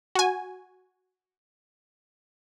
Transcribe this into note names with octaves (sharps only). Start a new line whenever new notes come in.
F#4 G#5